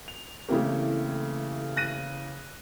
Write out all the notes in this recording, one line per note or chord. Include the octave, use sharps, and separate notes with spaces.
F7
C#3 E3 A3 A#3 C4 E4 G4
F#6 A#6 D#7